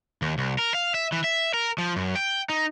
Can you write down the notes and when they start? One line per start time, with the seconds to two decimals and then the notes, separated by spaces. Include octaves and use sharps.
0.22 D#2
0.38 C2
0.59 A#4
0.74 F5
0.94 E5
1.12 E3
1.24 E5
1.54 A#4
1.78 F3
1.96 F#2
2.16 G5
2.49 D#4